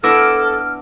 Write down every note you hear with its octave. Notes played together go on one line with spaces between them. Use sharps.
B3 D4 E4 A4 D6 E6 F6 A#6